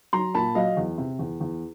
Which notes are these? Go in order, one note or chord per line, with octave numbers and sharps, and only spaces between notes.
F#3 A#5 C6
A#2 A5 B5
F#3 D#5 F5
E2
C3
E2
E2